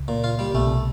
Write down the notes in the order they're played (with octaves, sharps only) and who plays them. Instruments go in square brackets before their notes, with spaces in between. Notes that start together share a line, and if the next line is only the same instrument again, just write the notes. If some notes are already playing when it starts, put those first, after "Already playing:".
Already playing: [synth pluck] C#2 C#3
[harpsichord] A#2
F4
G3
[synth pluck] B1 B2 [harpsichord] A3
[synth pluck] C3